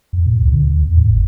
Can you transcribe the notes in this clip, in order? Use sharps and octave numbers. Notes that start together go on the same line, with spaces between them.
F2
A#2
C#2
D3
D#2
E2
G#2
G1